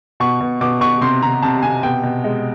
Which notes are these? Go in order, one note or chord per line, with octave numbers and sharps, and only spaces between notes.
B2 C#6
B2
B2 D6
B2 C#6
C3 C6
C3 A#5
C3 A5
C3 G#5
B2 G5
B2
G#3